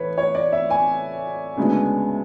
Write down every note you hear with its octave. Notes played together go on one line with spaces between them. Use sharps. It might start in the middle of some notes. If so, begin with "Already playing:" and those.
Already playing: A2 E3 B4 C#5
C#5
D5
E5
G#5
D2 C#3 G#3 B3 D4